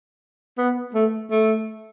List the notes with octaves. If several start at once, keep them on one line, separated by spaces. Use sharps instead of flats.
B3
A3
A3